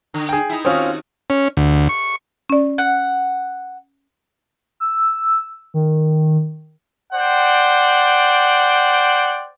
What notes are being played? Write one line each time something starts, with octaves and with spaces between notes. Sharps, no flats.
D3
G#4 G5
D#4 E4
D#2 C4 C#4 F4 F#4
C#4
D2
C#6
C#4 D5
F#5
E6
D#3
C5 D5 F#5 G5